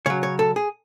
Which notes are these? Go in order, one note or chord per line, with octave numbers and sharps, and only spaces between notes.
C#3 F#3 C#5
C#5
A4
G#4